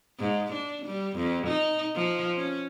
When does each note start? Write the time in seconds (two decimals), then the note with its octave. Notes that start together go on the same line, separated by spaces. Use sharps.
0.20 G#2
0.53 D4
0.86 G3
1.17 F2
1.47 D#4
1.95 F3
2.37 C#4